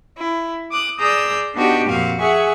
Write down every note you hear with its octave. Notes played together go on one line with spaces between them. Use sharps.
E4
D6 D#6 F#6
G#4 D5 A#5 D#6 E6 G6
B3 D4 D#4 F#4 G4 G5
F2 A#2 C4 F#4 F5
G#4 E5 F#5 G#5 C#6